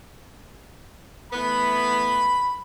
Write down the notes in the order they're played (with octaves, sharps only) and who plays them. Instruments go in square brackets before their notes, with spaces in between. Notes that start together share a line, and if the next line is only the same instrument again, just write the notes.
[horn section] E3 A3 B3 [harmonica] B5